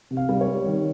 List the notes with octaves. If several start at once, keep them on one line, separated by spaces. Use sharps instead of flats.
C3
F5
G3
C#5
G3
D#3